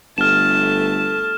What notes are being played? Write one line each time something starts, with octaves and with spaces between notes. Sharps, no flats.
G1 A3 A5 F6 E7